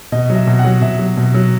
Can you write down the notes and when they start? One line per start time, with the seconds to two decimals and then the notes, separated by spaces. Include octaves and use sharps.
0.12 B2 D#5
0.30 F#3
0.35 E5
0.47 B2
0.59 F#5
0.65 F#3
0.81 B2 E5
0.99 F#3
1.17 B2
1.34 F#3